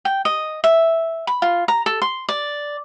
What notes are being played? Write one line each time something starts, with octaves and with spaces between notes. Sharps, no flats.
G5
D#5
E5
B5
F4
A#5
A4
C6
D5